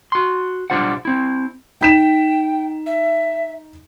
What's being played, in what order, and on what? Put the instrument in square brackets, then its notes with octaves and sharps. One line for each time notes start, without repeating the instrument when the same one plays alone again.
[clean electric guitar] F#4 C6
B1 G3 D4 F4 C5 F#5
C4 E4
[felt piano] D#4 B6 E7 [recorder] G5
[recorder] E5